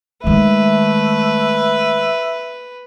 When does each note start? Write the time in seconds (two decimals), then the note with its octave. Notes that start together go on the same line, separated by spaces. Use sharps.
0.24 D#3 G#3 A3 B4 E5